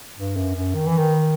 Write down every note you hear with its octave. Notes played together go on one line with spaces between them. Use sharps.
G2
F#2
F#2
D#3
E3
D#3